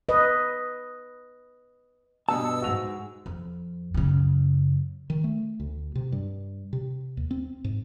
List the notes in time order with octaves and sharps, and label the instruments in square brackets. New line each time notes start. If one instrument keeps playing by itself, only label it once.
[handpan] B4 D#5
[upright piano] G2 B2 [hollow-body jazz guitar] A5 [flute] E6
[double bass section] G#2 [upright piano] F#4 F7
[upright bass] F2
F#2 C#3
[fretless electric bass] D#3
A3
D2
C3
G2
C3
D#2
C4
G#2